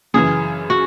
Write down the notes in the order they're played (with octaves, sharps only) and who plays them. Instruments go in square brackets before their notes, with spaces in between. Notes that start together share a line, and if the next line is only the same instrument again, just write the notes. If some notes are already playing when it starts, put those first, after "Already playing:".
[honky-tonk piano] F#2 C#3 E3 [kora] G#4
[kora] F#4